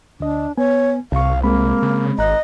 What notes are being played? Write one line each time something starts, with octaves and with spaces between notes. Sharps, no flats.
D2 D4 D#5
B3 C#5 G#5
C2 C3 F5 C#6
G#3 A#3 C4 B5
C#3
G#1 D#5 A#5 F#6